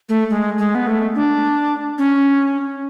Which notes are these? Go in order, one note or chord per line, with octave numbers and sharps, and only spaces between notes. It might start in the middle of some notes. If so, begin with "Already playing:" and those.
A3
G#3
G#3
B3
A3
D4
C#4